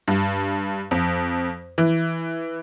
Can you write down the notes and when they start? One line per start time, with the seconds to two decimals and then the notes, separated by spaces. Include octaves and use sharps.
0.08 G2
0.91 F2
1.78 E3